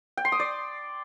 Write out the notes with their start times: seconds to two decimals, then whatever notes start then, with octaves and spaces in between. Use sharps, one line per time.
0.17 G5
0.25 C6
0.32 D#6
0.40 D5